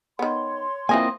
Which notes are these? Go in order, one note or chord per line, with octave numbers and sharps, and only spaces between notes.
D#3 B3 C#5 C6
E3 F3 A#3 C4 D#5 G#5